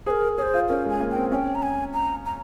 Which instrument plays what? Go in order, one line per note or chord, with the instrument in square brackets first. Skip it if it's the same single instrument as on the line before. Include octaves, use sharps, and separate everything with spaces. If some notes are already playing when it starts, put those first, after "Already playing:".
[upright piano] G#4 [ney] C5
[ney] A#4
[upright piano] G#4 [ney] C5 C#5
[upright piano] F4
[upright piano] C#4 [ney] A#4
[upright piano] G#3 [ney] G#5
[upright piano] A#3
[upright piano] C4 [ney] G5
[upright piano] C#4 [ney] G#5
[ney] G5
A#5
G#5
A#5
A#5